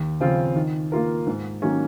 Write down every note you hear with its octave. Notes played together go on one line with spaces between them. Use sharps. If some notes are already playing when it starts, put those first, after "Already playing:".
Already playing: D#2
C#3 F3 C4 F4
D#3
A#3 F4 A#4
G#2
D#3 F#3 A#3 C#4